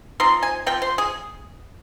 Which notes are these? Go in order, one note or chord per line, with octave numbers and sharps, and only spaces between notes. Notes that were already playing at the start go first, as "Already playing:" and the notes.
F3 C4 D#4 C6
G#5
F3 C4 G5
C5
G#4